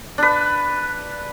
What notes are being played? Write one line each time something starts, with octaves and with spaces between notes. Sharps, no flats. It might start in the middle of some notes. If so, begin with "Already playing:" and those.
D4 B4